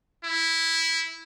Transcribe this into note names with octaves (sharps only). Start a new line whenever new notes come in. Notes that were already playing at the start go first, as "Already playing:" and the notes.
E4